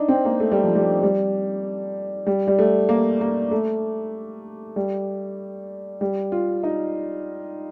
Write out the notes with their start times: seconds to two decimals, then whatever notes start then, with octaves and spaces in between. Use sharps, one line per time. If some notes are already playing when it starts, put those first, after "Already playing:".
Already playing: D4 D#4
0.08 C4
0.25 A#3
0.40 A3
0.52 G3
0.64 F3
0.75 G3
1.03 G3
2.27 G3
2.47 G3
2.59 A3
2.89 A#3
3.21 A#3
3.51 A3
4.76 G3
6.01 G3
6.32 F4
6.63 D#4